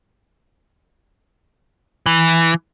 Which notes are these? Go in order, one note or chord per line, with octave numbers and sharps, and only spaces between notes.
E3